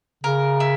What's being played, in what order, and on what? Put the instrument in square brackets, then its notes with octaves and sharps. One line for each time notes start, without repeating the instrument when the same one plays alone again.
[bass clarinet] C#3 [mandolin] A#4
[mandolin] E4